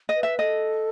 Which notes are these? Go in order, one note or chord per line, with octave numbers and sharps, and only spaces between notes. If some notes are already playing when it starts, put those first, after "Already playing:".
D#5
B4
E5
A4 D#5